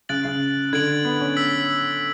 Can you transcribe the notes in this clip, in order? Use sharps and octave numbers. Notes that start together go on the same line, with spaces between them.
C#3 F#6 A6 D7 F#7
C#3
D3 G#6 D7 F#7
B3
C#4
E6 B6 F#7